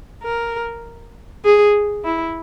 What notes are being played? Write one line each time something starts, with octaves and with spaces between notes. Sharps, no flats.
A#4
G#4
E4